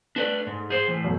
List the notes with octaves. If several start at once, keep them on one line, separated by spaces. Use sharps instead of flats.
A3 D4 B4 D5
G#2
G#4 C5 G6 F#7
A2 E3
F#2 B2 A3